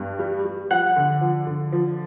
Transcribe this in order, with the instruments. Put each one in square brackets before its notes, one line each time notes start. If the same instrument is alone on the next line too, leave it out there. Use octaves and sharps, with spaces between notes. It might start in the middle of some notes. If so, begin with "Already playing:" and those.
Already playing: [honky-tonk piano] G2
G3
G3
[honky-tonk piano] F3 [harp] F#5
[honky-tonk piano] D3
F3
D3
F3